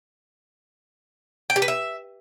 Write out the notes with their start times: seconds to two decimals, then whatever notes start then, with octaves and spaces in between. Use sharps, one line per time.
1.50 G5
1.56 G4
1.62 B4
1.68 E5